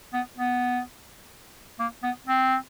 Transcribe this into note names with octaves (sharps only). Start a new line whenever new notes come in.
B3
B3
A#3
B3
C4